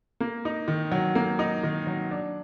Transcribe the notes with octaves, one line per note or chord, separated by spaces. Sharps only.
A#3
D#4
D#3
F#3
A#3
D#4
D#3
F#3
D4